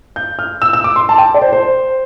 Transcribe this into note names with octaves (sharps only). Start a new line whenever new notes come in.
G6
F6
E6
E6
D6
C6
A5
G5
D5
C5
C5